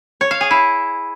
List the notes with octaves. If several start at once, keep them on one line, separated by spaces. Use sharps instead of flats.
C#5
F5
G#4
E4